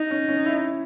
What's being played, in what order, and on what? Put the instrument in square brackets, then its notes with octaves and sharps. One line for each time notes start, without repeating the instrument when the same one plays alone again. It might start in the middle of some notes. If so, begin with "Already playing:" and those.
Already playing: [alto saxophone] D#4
[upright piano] C#4
C#4
E4